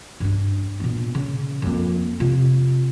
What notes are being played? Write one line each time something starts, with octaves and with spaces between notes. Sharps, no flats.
G2 D4
A#2 B3
C#3
F2 A#3
C3 F4